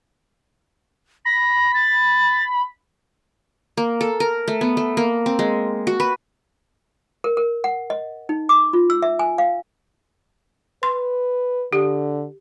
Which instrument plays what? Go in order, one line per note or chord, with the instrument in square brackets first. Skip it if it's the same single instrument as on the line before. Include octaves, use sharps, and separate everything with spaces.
[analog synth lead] B5 [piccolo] A#6
[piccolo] A6
[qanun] A#3
A4
A#4
A3
B3
A3
A#3
C4
G#3
F#4
B4
[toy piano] A#4
A#4
F#5
D#5
D#4
D6
F4
E6
E5
G#5
F5
[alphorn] B4 [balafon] C6
[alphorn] D3 [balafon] G4